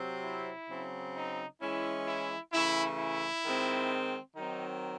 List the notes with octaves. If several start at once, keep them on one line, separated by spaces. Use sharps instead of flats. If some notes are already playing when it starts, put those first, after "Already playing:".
Already playing: C3 F#3 C4
E4
C#3 F#3 C4
D#4
E3 G#3 C#4 E4
E4
C#3 E3 A3 E4
E4
D#3 G#3 C4
D#3 F#3 C4 D#4